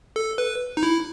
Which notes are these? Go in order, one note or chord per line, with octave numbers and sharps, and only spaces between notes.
A4
B4
D#4
E4